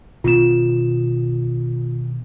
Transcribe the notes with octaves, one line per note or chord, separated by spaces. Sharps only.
B2 D#3 B3 F4 E7